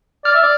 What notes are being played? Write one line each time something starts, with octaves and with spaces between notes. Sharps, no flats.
D5 F6
E5
D5